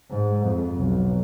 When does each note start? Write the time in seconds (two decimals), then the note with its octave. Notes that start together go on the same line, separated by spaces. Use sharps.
0.10 G#2
0.45 F2
0.76 B1